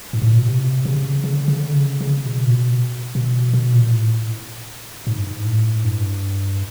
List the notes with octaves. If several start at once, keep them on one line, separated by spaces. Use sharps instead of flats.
G#2
A2
A#2
B2
C3
C#3
C#3
D3
C#3
D3
C#3
C#3
B2
A#2
B2
B2
B2
A#2
A2
G#2
G2
G#2
A2
G2